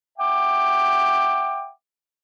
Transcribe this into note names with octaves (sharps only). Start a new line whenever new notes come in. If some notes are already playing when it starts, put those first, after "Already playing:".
E5 F#5 G5 D6